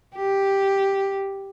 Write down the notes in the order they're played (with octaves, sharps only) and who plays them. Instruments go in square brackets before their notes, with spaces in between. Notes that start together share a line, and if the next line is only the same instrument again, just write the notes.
[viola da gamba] G4